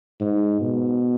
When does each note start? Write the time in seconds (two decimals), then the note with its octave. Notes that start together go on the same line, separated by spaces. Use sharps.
0.21 G#2
0.61 B2